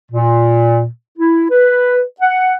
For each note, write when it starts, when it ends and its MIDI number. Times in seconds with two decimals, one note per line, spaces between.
0.11 0.87 46
1.18 1.46 64
1.51 2.02 71
2.21 2.57 78